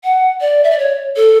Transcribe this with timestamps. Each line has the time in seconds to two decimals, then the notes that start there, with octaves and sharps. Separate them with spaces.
0.04 F#5
0.41 D5
0.64 E5
0.71 D5
0.79 C#5
1.16 A4